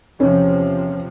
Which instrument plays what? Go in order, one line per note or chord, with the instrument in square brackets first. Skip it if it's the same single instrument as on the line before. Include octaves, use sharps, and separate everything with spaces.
[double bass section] E2 C3 F3 [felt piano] C#4